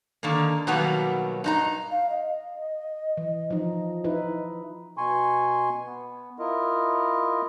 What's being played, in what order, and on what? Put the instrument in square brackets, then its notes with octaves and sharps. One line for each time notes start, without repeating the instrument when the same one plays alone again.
[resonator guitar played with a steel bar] D3 D#3 A#3
B2 D#3 F#3 G3 A#3 B3
G2 D#4 A#5
[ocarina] F5
D#5
[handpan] E3
F3 D#4
D#4 E4 B4
[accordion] B2 G#5 C6 C#6
B3
E4 F4 A#4 D#5